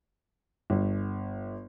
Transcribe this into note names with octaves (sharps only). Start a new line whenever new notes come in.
G1